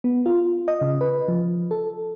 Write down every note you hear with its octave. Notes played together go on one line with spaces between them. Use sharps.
B3
F4
D#5
C#3
B4
F3
A4